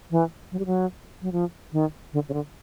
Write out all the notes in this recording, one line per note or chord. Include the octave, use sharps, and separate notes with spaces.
E3
F#3
G3
F#3
F#3
F3
D#3
D3
C#3
D3